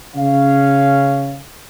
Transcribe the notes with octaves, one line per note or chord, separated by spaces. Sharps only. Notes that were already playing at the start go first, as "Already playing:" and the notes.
C#3 C#4 F5